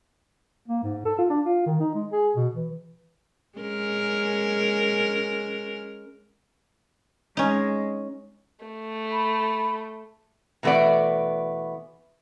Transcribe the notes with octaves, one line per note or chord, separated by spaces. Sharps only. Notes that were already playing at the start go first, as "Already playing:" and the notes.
A#3
G#2
A4
F4
D4
F4
D#3
D#4
G#3
G#4
B2
E3
G#3 C#4 A#4
G#3 C#4 D#4
A3
B5
B2 E3 A3 B3 D5